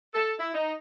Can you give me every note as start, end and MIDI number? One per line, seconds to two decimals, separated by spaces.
0.14 0.33 69
0.39 0.51 64
0.54 0.73 63